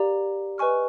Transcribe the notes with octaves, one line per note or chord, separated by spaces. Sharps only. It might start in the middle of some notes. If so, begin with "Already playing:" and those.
Already playing: G4 A#4 D5 F5 A#5
B4 D#5 G#5 C#6 F6